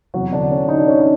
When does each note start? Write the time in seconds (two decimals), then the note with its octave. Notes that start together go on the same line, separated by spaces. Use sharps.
0.14 E2 C3 E3 F#3 F#4
0.32 D3 D4
0.51 C#4
0.69 D#4
0.78 D4
0.88 C#4
1.01 D#4